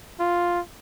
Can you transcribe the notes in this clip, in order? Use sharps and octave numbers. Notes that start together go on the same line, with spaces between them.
F4